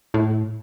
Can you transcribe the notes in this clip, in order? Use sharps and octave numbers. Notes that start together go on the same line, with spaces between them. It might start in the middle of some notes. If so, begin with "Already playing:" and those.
A2